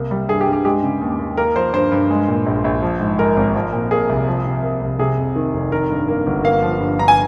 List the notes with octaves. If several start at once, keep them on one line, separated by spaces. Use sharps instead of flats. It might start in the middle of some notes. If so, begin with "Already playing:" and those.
Already playing: C2 A#3
G3
G2 G#4
G4
G2
G4
G#3 G4
C#3
D#2
D#2
A#3 A#4
F3 C5
G2 C5
G2
G#3
A#2
A#1
A#1
F3
G#2
G#3 A#4
G#1
F3
A#2
A#3 G#4
C2
F3
C3
A#3
C2
C3 G#4
F2
D#3
F1
D#3 A#4
G2
A#3
G1
A#3 F5
F3
G2
G2 A#5
G#5